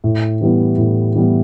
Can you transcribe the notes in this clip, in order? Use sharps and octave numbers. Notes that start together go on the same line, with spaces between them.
A2
E3 G3 B3
A2
E3 G3 B3